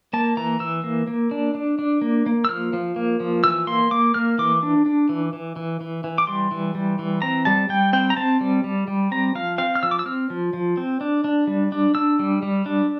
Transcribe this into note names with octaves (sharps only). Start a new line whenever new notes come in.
A#3 A5
E3 A#5
E3 E6
A#3
A#3
D4
D4
D4
A#3
A#3
E6
F3 F6
F3
A#3
F3
E3 E6
A#3 C6
A#3 D6
A#3 F6
E3 D6
D4
D4
E3
E3
E3
E3
E3
D6
G3 C6
E3
G3
E3
C4 A#5
G3 A5
G3 G5
C4 G5
A#5
C4 A5
G3
G3
G3
C4 A#5
F3 F5
C4 F5
F6
F3 E6
D6
E6
C4 F6
F3
F3
C4
D4
D4
G3
D4
D4 E6
G3
G3
D4